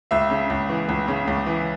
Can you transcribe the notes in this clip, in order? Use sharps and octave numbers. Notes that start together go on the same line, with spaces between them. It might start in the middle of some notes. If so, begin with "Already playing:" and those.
C#2 E5
C#3
C#2
E3
C#2
C#3
C#2
E3